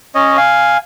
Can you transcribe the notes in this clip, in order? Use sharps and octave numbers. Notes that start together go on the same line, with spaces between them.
C#4 C#5 D#5
F5 G#5